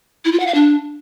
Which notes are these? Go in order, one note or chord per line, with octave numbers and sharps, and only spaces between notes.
E4
F4
F#5
F5
D4